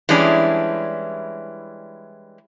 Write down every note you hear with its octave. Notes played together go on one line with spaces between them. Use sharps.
E3 G3 G#3 C#4 D4 E4